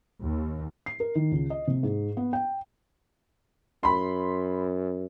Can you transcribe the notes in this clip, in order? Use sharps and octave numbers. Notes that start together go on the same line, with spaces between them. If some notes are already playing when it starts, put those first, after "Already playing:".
D#2
C7
A#4
D#3
C#2
D#5
C3
G#2
B3
G5
F#2 B5 C6